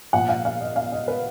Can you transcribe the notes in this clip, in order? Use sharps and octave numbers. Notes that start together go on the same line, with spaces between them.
A#2 F3 F#5
F5
F5
D#5
F5
D#5
B4